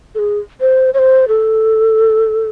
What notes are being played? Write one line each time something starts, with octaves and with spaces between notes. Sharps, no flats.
A4
G#4
C5
C#5
C5
A4